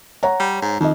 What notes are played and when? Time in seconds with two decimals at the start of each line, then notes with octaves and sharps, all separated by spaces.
0.23 C#5 F#5 A#5
0.40 G3
0.62 G#2
0.80 F2 D#3 D#5